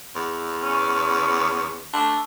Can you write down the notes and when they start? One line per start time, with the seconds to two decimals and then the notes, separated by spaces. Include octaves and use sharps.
0.15 E2
0.63 C#4
1.93 A3 D4